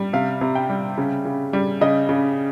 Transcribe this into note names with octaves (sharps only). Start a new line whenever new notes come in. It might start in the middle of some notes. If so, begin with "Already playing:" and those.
Already playing: G3
C3 F5
C3
G5
G3
C#3
C#3
G3
C#3 D#5
C#3